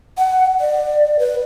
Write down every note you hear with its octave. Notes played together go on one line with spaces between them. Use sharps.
F#5
D5
B4